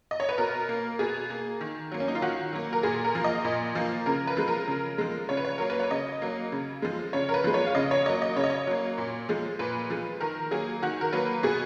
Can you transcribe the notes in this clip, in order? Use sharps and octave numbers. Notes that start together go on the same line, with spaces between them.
D#5
C#5
B4
B2 A#4
A#3
B2 G#4
A#3
D#3
F#3 A#3
C#4
D#4
F4
D#3 F#4
F#3 A#3
A#4
A#2 G#4
A#4
F3 A#3
D#5
A#2
F3 A#3
C#3 A#4
B4
F3 G#3
A#4
C#3
F3 G#3
C#3 C#5
B4
C#5
F#3 A#3 A#4
B4
C#5
C#3 D#5
F#3 A#3
C#3
F3 G#3
C#3 C#5
A#4
B4
F3 G#3
C#5
F5
C#3 D#5
C#5
F#3 A#3 D#5
D#5
C#3 C#5
D#5
C#5
F#3 A#3
A#2
F3 G#3
A#2 B4
F3 G#3
D#3 A#4
F#3 A#3 G#4
D#3 F#4
A#4
F#3 A#3 B4
B2 G#4